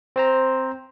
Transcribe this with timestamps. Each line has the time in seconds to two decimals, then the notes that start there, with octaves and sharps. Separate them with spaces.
0.16 C4 C5 A#5